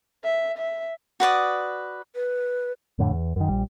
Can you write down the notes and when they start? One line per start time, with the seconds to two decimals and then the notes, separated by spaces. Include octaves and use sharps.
0.24 E5
0.58 E5
1.20 F#4 B4 D5 D#6
2.15 B4
2.99 F2 A2 D3
3.11 E2
3.36 F#2 D#3
3.48 A#1 G3